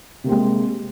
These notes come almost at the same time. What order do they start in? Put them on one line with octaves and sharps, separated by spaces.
C3 A#3 C4 G#3